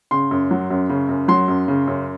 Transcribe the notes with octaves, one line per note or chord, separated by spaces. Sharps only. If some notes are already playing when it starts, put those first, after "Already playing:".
C#3 C6
F#2
F#3
F#2
C#3
F#2
F#3 C6
F#2
C#3
F#2